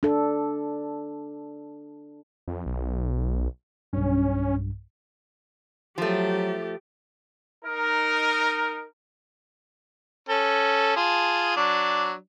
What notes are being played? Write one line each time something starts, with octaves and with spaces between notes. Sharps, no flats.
D4 A4
F2
B1
B1 G2 C#4
F3 F#3 A3 G4
D#4 A#4
C#4 A4
F4 G#4 A5
F#3 D4